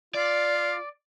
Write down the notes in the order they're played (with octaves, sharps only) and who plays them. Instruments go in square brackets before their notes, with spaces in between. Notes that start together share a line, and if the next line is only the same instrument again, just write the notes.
[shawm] F4 [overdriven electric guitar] D5